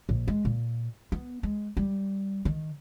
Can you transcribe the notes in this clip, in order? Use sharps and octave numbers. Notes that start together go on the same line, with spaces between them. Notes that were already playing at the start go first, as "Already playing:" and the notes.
A#1
G#3
A#2
B3
G#3
G3
D#3